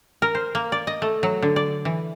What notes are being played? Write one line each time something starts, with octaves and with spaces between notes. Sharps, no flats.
A#4
C5
A#3
D5
D#5
A3
F#3
D3
D5
E3